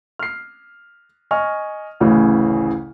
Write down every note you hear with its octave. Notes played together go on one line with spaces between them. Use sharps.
F6 C7
D#5 G#5 C#6 F6
A1 D2 C#3 E3